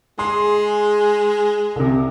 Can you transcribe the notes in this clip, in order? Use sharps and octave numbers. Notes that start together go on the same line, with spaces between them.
G#3 G#4 C6
C2 C3